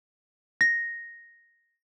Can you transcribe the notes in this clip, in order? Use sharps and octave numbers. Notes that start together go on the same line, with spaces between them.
A#6